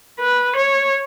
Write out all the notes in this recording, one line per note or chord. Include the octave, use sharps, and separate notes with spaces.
B4
C#5